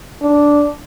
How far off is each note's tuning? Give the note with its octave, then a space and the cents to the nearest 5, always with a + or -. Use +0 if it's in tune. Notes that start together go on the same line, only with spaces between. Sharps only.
D4 -5